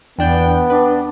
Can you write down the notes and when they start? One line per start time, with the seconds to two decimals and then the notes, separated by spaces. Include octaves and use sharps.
0.19 E2 B3 D4 G5 G6
0.70 D4 B4